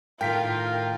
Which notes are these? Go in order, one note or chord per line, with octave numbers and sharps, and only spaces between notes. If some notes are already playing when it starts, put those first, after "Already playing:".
A2 D#3 F4 A#4 G5 B6